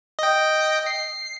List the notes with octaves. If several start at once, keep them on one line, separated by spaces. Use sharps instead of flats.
D#5 G5
C7